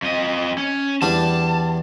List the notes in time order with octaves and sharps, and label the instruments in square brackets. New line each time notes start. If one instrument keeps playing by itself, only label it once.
[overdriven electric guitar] F2 D#5
C#4
[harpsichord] E2 G3 D4 [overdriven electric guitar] A5